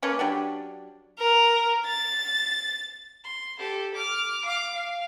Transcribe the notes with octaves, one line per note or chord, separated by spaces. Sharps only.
A#3 C#4 A4 B4
F#3 D4 G4
A#4
A6
C6
G4 A4
D6 F6
F5 D6
F5